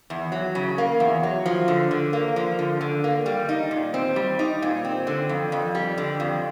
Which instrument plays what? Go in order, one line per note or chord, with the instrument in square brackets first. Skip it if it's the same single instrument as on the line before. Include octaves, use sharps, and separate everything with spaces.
[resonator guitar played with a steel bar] E2
F#3
C#3
A#3
E2
F#3
F3
D3
D3
A#3
F3
D3
D3
A#3
G3
D#4
A#2
C4
G3
D#4
A#2
C4
D3
F2
F2
G3
D3
F2